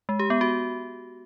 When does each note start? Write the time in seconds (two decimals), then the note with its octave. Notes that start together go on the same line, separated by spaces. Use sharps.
0.09 G#3
0.19 G4
0.30 B3
0.41 F#4